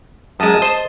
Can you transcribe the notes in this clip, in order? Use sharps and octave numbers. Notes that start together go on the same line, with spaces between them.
F#2 G#3 A5 D#6
C5 D#5